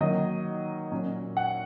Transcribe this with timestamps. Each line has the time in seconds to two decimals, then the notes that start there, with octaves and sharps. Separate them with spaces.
0.01 D#3 F#3 A#3 D#4 D#5
0.92 A#2 F#3 C#4
1.37 F#5